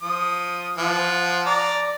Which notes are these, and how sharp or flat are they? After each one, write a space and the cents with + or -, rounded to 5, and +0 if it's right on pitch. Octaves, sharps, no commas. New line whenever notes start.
F3 +10 D#6 +0
F3 +0 F#5 -20
D5 +0 A#5 +0 D6 +0